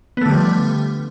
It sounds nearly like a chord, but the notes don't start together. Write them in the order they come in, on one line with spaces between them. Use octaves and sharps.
B3 A3 D3 G3 F3